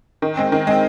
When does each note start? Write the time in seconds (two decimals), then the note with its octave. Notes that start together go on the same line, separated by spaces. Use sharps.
0.22 D#3
0.37 G#3 C4
0.52 D#3
0.67 G#3 C4